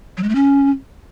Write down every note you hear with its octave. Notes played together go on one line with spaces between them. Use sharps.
F#3
G#3
A3
C#4